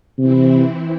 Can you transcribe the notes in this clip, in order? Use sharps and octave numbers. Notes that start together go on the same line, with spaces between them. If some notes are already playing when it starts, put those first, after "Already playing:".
C3 E3 C4 E4